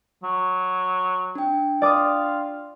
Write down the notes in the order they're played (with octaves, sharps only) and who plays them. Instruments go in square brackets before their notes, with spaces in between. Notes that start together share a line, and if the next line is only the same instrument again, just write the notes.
[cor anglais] F#3
[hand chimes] D4 G5
[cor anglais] F4 [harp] D5 D6 D#6